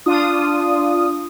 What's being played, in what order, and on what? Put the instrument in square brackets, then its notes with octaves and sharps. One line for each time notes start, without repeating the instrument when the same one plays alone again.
[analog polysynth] D4 F4 D#6